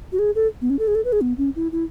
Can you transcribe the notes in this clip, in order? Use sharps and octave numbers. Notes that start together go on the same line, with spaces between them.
F#4
G#4
A4
B3
C#4
A4
G#4
A4
B4
G#4
B3
C#4
E4
E4